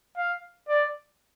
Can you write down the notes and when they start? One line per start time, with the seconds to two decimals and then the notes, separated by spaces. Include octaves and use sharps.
0.17 F5
0.69 D5